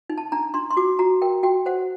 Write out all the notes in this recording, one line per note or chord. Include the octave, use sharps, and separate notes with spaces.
D#4
A5
D4 A#5
D4 C6
C6
F#4 D6
F#4 A#5
A#4 G5
F#4 G5
C5 F#5